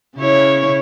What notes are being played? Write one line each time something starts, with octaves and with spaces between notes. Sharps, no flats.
C#3 E4 C#5